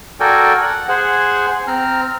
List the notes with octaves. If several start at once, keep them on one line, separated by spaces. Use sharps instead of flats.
F#4 A4 A#4 D5 G5 G#5
F#5
G#4 C5 F#5 G#5
C4 A#5 F6